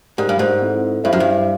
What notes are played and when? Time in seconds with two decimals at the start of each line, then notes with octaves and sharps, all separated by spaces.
0.18 G#2 G4 A#4 D5 F#5
0.29 G2
0.39 G#2
0.62 C4 E4 A4
1.04 G2 E4 G4 C5 E5
1.13 F#2
1.20 G2